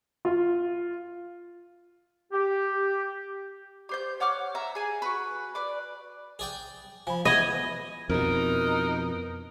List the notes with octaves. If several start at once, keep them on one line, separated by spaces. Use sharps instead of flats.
F4
G4
G4 C5 G6
C#5 F#5 D6 F6
E5 A#5
G#4 G#5
F#4 B4
B4 D5 D6
G#4 D5 G5
F3 G#5 B5
E3 B3 G#4 D#5 B5 G#6
F2 B2 E3 D#4 A#4